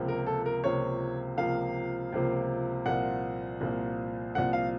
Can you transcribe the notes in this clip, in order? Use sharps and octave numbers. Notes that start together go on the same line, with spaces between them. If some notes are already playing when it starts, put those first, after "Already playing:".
Already playing: C#2 C3 F3 A#3
A#4
A4
A#4
C#2 C3 F3 A#3 C#5
C#2 C3 F3 A#3 F5
C#2 C3 F3 A#3
C2 A#2 F3 A#3 F#5
C2 A#2 F3 A#3
C2 A#2 F3 A#3 F#5
F5